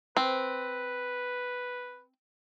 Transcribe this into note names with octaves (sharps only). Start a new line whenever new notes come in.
C4 B4